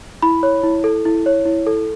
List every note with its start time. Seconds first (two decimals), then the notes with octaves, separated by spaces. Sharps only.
0.23 E4 B5
0.43 C#5
0.64 E4
0.84 A4
1.05 E4
1.26 C#5
1.46 E4
1.67 A4